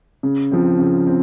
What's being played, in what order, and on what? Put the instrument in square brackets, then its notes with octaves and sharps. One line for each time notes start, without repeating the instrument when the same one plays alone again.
[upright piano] C#3
F3 C4
C#3
C4